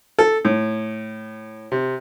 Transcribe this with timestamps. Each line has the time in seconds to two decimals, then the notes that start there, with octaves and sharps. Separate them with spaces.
0.19 A4
0.45 A2
1.72 C3